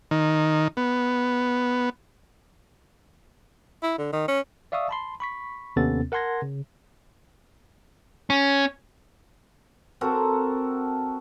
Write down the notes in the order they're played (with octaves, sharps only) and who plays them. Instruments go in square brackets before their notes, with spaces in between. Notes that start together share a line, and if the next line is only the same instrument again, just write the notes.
[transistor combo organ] D#3
B3
[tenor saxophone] E4
D3
D#3
C#4
[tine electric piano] D5 E5 F5 C#6 D#6 E6
A5 B5 C6
B5 C#6 B6
D#2 C3 B3 C#4 A4 A6
A#4 F#5 A5 C6 G#6 A#6
C#3
[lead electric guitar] C#4
[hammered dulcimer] C4 F#4 A4 A#4